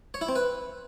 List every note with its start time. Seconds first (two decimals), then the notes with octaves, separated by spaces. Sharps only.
0.14 C#5
0.21 E4
0.28 C4
0.36 B4